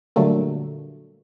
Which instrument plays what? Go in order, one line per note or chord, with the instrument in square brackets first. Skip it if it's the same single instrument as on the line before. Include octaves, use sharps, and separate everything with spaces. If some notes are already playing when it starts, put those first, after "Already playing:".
[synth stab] A#2 D3 F#3 G3 A3 A#3